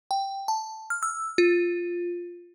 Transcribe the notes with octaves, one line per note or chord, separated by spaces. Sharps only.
G5
A5
F6
E6
F4